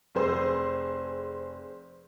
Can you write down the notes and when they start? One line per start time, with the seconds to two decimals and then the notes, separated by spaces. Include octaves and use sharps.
0.15 F1 G#4 C5 C6 E6